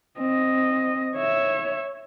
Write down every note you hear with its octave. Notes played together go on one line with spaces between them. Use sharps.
C4 D#5
C#5 E5